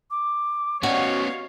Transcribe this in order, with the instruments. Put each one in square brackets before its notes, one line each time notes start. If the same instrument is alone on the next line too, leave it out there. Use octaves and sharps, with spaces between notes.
[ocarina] D6
[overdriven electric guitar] B3 C#4 [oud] F#4 [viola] C#5 F5 [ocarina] D#5